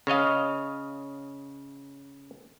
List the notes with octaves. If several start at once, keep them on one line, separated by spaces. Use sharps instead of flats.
C#3 C#5 D#5 F5